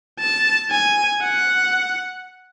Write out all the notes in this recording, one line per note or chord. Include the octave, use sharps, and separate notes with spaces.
A5
G#5
F#5